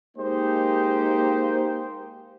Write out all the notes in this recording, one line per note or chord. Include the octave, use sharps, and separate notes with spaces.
G#3 A#3 D#4 G4 C5